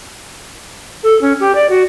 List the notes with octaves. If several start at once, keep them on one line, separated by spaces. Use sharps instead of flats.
A4
C#4
G4
D5
F#4